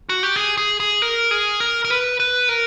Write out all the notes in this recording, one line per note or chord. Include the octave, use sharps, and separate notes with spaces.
F#4
G4
G#4
G#4
G#4
A#4
G#4
A#4
A#4
B4
B4
A#4